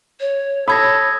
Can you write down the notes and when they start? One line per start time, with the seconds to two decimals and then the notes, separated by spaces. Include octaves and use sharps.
0.20 C#5
0.68 A4 C#5 B5 D#6 G#6 A#6